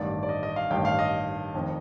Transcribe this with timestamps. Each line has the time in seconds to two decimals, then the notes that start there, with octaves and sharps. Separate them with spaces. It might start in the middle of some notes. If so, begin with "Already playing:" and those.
Already playing: A1 G2 D#3 D5
0.23 D5
0.29 D#5
0.43 D#5
0.56 F5
0.70 A1 G2 D#3 G5
0.85 F5
0.99 D#5
1.54 F1 F2 D#3